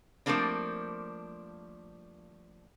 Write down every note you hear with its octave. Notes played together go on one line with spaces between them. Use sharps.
F3 G3 A3 A#3 C4 D4